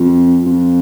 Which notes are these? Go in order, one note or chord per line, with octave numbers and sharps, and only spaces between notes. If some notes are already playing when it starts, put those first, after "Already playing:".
Already playing: F2
F2